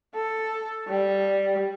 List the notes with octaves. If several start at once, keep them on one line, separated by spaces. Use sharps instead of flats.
A4
G3